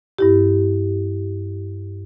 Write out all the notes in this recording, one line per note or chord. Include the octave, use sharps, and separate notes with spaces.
G2 E4 G4